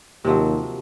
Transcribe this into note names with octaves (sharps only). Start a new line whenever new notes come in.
D#2 C3 F3 F#3